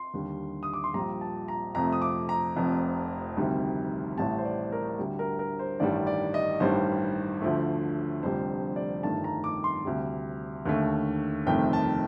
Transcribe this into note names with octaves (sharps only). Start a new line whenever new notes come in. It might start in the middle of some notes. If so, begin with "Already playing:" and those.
Already playing: C6
D#2 D3 G3
D#6
D6
C6
A#1 A#2 G3 A#5
A5
A#5
F2 C3 F3 A3 A#5
D#6
D6
A#5
F1 F2 C3
D2 C3 D#3 G3
A1 A2 G3 A5
C5
D5
A#4
D2 D3 G3
A#4
A#4
C5
A1 G2 D#3 G3 D5
D5
D#5
A1 G2 D#3 G3 C5
D2 D3 F3 A3
F1 F2 D3 G3 C5
D5
G1 G2 D#3 A3 A5
A#5
D6
C6
D2 C3 G3
D#2 D3 A3
G1 F2 C3 D#3 A3 G5
A5